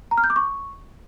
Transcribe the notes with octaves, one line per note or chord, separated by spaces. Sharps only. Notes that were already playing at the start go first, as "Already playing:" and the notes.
A#5
F6
G6
D6
C#6